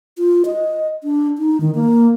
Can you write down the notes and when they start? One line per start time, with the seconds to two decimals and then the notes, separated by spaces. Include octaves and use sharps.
0.18 F4
0.46 D#5
1.04 D4
1.38 D#4
1.60 D#3
1.75 A#3